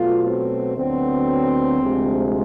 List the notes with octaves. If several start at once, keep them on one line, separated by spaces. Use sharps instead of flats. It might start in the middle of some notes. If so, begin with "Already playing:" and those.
Already playing: B2 F#3 A3 F4
C4
D2 D3 F#3 B3 C4
D2 C3 F3 G#3